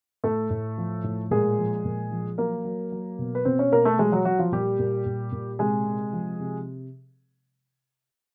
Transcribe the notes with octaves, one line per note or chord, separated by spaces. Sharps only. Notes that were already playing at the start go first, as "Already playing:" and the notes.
A2 A3 A4
A2
F3
A2
A#2 G#3 G#4
F3
A#2
F3
F#3 A#3 A#4
F#3
F#3
B2
B4
B2 C4 C5
C#4 C#5
B2 A#3 A#4
A3 A4
F#3 G#3 G#4
F#3 F#4
F#3 F#4
F3 F4
A#2 G3 G4
A#2
A#2
A#2
C3 G#3 G#4
C3
F3
C3